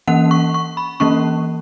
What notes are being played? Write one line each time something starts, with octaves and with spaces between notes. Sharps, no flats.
E3 A#3 C#4 F#5
C#6
C#6
B5
E3 A#3 C#4 C#6